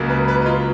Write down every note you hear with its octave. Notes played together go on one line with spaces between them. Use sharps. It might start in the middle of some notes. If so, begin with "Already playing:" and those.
Already playing: C#2 C#3 F#3 A#3
B4
B4
D#4
F4